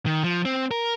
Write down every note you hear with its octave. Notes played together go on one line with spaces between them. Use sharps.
D#3
F3
C4
A#4